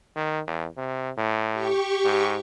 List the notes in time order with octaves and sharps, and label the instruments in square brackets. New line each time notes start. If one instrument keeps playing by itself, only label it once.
[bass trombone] D#3
E2
C3
A2
[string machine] G4 C#6
[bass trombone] G#2